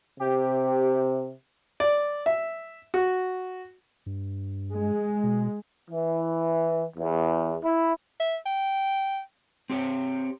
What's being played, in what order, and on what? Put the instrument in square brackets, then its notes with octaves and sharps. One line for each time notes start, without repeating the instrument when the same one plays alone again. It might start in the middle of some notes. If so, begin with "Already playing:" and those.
[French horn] C3 [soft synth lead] G4
[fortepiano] D5
E5
F#4
[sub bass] G2
[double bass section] G#3
[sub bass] B2
[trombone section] E3
E2
E4
[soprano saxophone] E5
G5
[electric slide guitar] C4 G4 C#5